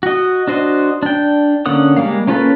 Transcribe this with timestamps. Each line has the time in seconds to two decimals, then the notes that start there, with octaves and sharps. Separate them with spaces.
0.03 F#4 D#5
0.47 D4 F#4 C5 D#5
1.03 D4 G5
1.66 D3 A#3 C#4 F#5 D#6
1.97 G3 G#3 A#3 F5
2.27 A#3 C#4 F4 A4 B4